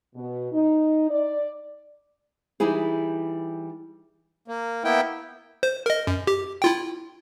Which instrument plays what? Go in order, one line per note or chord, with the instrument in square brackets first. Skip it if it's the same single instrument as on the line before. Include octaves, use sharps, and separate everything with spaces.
[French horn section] B2
D#4
D5
[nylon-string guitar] E3 G3 D#4 E4 G#4
[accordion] A#3
A#3 B3 E4 G5
[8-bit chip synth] C5
A#4 D#5
F#2
G4
E4 F4 G5